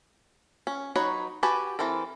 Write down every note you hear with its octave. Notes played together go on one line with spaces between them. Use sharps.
C#4
F#3 D#4 B4 C#5
F#4 G4 B4 G#5 A5
E3 C4 A4 A#4